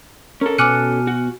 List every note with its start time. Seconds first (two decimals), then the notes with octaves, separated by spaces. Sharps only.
0.41 C#4 A4 A#4
0.58 B2 G#5 D6 F6 F#6 C#7 D#7
1.07 F#4